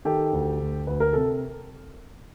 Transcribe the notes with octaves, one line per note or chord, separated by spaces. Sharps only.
D#3 G4 A4
D2
D2
D2 B4
A#4
C3 A4